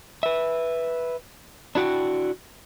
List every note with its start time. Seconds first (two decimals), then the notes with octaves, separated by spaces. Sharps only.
0.23 B4 E5
1.75 D4 E4 F#4 G5